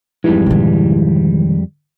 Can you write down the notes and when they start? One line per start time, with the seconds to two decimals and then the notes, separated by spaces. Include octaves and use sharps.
0.24 F2 G#2 E3 G3 G#3
0.46 B2 D#3